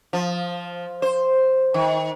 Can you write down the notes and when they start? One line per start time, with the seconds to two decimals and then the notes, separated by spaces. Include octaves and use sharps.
0.13 F3
1.02 C5
1.74 D#3